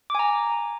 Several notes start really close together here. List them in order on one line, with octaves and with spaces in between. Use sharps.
D6 G#5 A#5